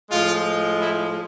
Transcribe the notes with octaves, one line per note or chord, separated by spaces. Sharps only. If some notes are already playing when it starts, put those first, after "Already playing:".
A2 F3 G#3 F4
E4